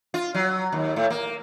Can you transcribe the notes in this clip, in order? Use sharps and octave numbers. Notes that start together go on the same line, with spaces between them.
F4
F#3
D#2
A2
A#3